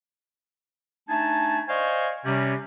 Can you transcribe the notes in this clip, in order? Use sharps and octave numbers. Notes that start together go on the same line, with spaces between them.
A3 D4 D#4 G#5 A5
C5 D5 D#5 F5 G#5 C#6
C3 G3 C#4